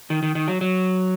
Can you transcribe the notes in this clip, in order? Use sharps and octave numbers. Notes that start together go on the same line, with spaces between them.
D#3
D#3
D#3
F#3
F#3